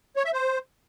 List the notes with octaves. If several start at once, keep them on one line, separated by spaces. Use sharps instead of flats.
C#5
E5
C5